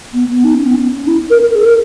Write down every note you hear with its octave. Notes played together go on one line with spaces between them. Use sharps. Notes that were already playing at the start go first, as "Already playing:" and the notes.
B3
B3
D#4
C#4
B3
C#4
E4
A#4
A#4
G#4
A#4